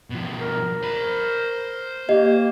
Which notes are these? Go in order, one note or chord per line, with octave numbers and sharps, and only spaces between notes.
B2 F3
A#4
C5 B5
A#3 G4 D#5